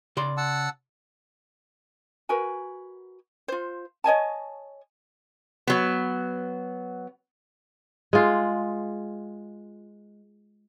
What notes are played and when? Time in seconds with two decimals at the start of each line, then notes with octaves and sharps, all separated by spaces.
0.17 C#3 D5 C6
0.37 F#5 A5 E6
2.29 F#4 A#4 B4 G#5
3.48 F4 C5
4.04 C#5 D#5 G#5 A5
5.67 F#3 B3
8.13 G#3 F4